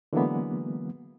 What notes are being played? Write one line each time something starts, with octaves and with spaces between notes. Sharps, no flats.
D3 E3 F#3 G#3 A#3 B3